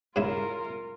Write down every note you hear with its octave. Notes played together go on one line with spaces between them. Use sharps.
G#2 C#3 E4 F4 A#4